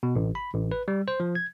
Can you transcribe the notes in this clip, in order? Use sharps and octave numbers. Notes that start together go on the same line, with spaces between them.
B2
A1
B5
A1
B4
G3
C5
F3
G#6